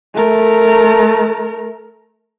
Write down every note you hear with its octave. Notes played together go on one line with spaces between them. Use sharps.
A3 A#4